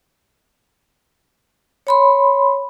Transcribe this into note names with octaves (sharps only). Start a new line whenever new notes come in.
C#5 B5 C6